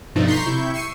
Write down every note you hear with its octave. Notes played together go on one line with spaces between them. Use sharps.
G2 B2 F3 A3 D4 D#4
A#5 C6 C#6 G6 B6 C7
C3 E4 C#6 G6
C#6 E6 C7 C#7 D#7